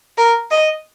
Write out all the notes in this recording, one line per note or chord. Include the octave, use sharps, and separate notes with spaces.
A#4
D#5